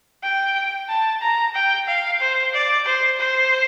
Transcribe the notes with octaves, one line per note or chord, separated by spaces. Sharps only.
G5
A5
A#5
G5
F5
C5
D5
C5
C5